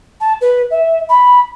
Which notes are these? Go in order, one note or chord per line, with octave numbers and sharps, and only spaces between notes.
A5
B4
E5
B5